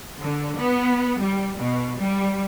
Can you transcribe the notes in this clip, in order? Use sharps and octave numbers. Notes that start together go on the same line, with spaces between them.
D3
B3
G3
B2
G3